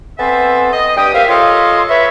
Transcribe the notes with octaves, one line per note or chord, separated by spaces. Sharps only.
B3 C4 A4 C5 E5 G#5
D#5
G2 G4 G5 D#6
G4 A#4 C5 E5 F5
F4 A4 C#5 D#5 F5 C6
B4 C#5 E5